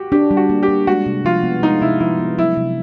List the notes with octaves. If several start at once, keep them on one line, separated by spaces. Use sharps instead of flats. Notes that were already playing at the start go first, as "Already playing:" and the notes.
Already playing: F#4 G4
D4 G4
G3
F#4
A#3
G4
G3
G#3 F#4
C3
F3 F4
B3
G#3 D#4
C3 E4
F3 E4
B3
F#3 E4
C3